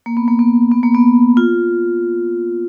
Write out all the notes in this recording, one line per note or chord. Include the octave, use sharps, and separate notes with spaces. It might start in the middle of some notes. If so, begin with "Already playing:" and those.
A#3
B3
A#3
B3
B3
A#3
B3
F4